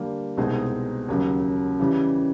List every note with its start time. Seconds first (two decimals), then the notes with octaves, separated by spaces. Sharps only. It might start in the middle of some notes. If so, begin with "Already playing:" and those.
Already playing: D3 G3 A#3
0.37 C2 B2 G#3 C4 D#4
1.09 D#2 C#3 F#3
1.79 C#3 E3 G3